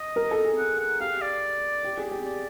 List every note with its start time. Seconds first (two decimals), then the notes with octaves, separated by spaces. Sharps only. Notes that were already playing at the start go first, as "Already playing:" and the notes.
Already playing: D#5
0.16 A#4
0.31 A4
0.45 G#4
0.58 F#5
0.80 F#5
1.00 G4 F5
1.21 D5
1.84 G4
1.97 G#4
2.11 G4
2.26 D5